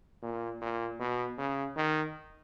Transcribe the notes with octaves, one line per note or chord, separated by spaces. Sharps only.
A#2
A#2
B2
C#3
D#3